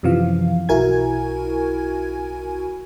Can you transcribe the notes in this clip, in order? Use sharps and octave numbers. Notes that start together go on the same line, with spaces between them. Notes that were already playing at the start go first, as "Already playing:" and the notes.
F#2 C3 E3 F3 F5
B1 E4 F#4 A#4 G#5 G#6